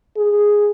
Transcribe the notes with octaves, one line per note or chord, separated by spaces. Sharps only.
G#4